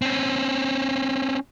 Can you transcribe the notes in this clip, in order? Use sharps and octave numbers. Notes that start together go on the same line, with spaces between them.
C4 C#4